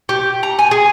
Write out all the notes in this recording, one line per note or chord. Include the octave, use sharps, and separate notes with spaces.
G4
A#5
G#5
G#4